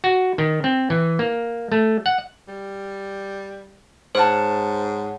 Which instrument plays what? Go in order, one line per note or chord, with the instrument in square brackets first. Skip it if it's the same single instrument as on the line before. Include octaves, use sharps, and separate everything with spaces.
[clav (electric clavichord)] F#4
D#3
C4
E3
A#3
A3
F#5
[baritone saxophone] G3
[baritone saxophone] G#2 [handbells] C5 [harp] C#5 F#5 A5